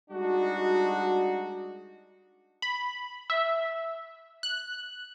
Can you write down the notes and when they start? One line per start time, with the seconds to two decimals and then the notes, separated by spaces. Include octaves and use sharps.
0.11 G3 G#3 D4 D#4 F#4
2.62 B5
3.30 E5
4.43 F#6